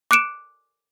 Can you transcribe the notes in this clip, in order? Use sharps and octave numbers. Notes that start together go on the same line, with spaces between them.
D6 F#6 C#7 D7 E7